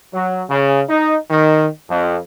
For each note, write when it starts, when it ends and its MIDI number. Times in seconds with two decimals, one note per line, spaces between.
0.13 0.44 54
0.49 0.82 49
0.89 1.17 63
1.30 1.67 51
1.90 2.18 41